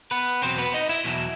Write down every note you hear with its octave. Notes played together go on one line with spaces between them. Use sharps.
B3 B4
E2 B2 F#3 C4 C5
B3 B4
D#4 D#5
E4 E5
E2 B2 F#3